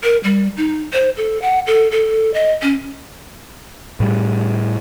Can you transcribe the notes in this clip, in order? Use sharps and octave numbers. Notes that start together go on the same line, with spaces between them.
A#4
G3
D#4
C5
A4
F#5
A4
A4
D#5
C#4
A2 G3